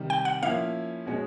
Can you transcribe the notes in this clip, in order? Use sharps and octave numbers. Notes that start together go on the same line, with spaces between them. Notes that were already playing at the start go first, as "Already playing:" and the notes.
Already playing: C3 D#3 G3
G5
F#5
F3 A#3 C#4 E4 F5
B2 G#3 C#4 F#4